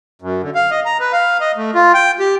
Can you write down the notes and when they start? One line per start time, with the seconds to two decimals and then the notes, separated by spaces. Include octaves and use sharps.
0.22 F#2
0.43 D3
0.55 F5
0.71 D#5
0.85 A#5
1.00 B4
1.12 F5
1.41 D#5
1.57 A3
1.74 F4
1.94 G5
2.20 G4